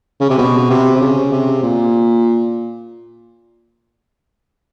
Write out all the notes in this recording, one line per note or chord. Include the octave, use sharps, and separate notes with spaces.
C#3
C3
B2
C3
C3
C#3
C3
A#2